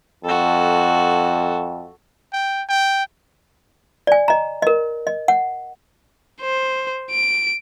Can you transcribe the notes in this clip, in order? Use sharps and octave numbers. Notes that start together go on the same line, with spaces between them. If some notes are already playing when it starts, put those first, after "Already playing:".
F2 F#4 A4
G5
G5
D5 G#5
D#5 A#5
A#4 D#5
D#5
F#5
C5
D7